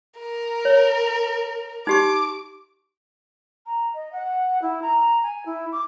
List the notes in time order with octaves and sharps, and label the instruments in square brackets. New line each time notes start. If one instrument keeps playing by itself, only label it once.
[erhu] A#4
[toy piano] C#5
[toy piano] D#4 G4 C#6 [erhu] D6
[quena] A#5
D#5
F#5
E4
A#5
G#5
E4
D6